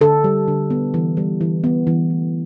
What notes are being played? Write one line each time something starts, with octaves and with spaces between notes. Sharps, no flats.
D3 A4
G3
D3
B3
E3
G3
E3
B3
E3
A3